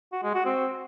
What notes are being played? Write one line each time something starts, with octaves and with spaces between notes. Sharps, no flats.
F#4
G#3
F#4
C4